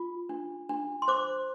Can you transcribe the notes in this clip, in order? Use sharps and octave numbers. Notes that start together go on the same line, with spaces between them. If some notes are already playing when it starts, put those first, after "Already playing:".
Already playing: F4
D4
D4
C6
C5 D6